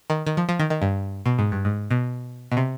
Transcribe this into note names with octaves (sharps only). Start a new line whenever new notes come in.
D#3
D#3
F3
F3
D#3
D#3
G2
B2
G#2
G2
G#2
B2
B2
C3